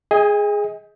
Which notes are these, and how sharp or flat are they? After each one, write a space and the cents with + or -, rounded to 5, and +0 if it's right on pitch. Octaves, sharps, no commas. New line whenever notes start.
G#4 +0 D#5 +25 G#5 -45